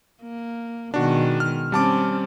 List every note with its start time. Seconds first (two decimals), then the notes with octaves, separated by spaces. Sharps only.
0.23 A#3
0.94 B2 D#3 G#3 D4 F#4
1.40 F6
1.72 G3 C4 C#4 A5 D6